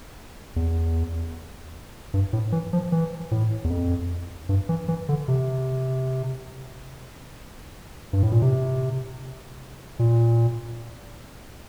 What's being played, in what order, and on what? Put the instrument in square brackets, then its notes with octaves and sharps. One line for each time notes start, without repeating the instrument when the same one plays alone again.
[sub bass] E2
G2
A2
E3
F3
E3
A2
E2
F2
G2
E3
E3
D3
C3
G2
A2
A#2
C3
A#2